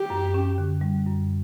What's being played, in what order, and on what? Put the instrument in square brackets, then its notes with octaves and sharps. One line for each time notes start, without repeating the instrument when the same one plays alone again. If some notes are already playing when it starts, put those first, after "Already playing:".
Already playing: [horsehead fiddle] G4
[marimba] F#2
C#4
D3
G3
F#2